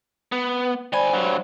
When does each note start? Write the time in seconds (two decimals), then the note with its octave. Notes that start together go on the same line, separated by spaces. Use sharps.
0.32 B3
0.93 D#3 C5 D5 G#5 B5
1.13 G2 F#3